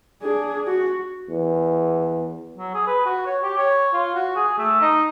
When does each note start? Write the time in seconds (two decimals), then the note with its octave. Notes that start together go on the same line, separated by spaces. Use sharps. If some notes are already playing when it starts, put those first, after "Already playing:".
0.22 D4 G#4
0.67 F#4
1.30 E2
2.57 F#3
2.74 G#4
2.87 B4
3.06 F#4
3.26 C#5
3.43 G4
3.57 C#5
3.94 F4
4.15 F#4
4.36 G#4
4.58 A3
4.81 D#4